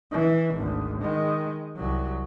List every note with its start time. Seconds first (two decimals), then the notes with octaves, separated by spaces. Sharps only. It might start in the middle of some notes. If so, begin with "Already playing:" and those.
0.11 E3
0.55 G#1 D2
1.01 D#3 G#3
1.76 C2 F#3